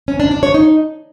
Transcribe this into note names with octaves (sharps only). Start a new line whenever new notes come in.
C#4
D4
D4
C#5
D#4